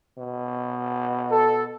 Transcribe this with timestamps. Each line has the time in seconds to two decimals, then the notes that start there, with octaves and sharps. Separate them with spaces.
0.18 B2
1.32 A4